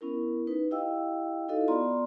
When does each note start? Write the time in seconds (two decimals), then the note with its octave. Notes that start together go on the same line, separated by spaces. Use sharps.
0.01 B3 C#4 E4 A#4
0.47 D#4 B4
0.71 E4 G4 D#5 F5 G5 E6
1.48 D#4 E4 F#4 A4 D#5 F5
1.68 B3 F4 D5 A#5 C6